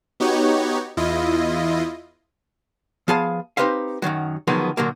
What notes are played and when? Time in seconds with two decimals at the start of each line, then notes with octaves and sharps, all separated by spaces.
0.20 B3 D#4 F#4 G4 C#5
0.97 E2 E4 F4 D#5
3.08 F3 B3 G#4 F5 A5
3.57 C4 D#4 G4 B4 C5 F5
4.02 F#2 A2 D#3 F#3
4.47 D3 D#3 F3 F#3 G#3 B3
4.77 A#2 D3 F#3 A#3